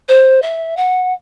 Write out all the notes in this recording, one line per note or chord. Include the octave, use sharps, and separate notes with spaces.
C5
E5
F#5